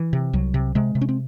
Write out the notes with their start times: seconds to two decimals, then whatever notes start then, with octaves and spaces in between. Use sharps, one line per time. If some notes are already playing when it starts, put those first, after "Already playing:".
Already playing: E3
0.13 C3
0.33 C2 F#3
0.54 C3
0.75 C3 G#3
0.95 C3
1.01 C#4
1.09 C4